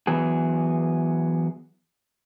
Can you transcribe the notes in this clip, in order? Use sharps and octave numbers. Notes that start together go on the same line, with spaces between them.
E3 F#3 B3 G#4